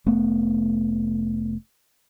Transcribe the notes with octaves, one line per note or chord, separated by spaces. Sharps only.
F1 A3 B3